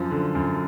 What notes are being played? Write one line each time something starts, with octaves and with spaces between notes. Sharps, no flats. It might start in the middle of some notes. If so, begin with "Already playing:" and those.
Already playing: F#2 F3
D3
F#2